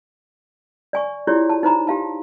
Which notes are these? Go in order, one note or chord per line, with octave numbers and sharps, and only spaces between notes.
D5 G#5 C#6
E4 F4 G4 G#4 C#5 D5
A5
D#4 C5 A#5 B5
G4 F5 A5